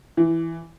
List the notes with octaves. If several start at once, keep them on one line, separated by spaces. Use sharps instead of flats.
E3